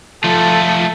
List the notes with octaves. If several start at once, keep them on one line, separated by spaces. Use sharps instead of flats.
F3 A3 F4 A4